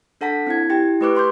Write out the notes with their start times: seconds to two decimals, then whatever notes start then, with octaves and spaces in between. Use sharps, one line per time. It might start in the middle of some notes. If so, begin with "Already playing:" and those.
0.21 D4 A4 F#5 A5 B6
0.47 C4 E4 G#6
0.69 E4 G4 G5
1.01 A3 G4 B4 C#6 D6 F#6
1.15 B5 C6 D6 G6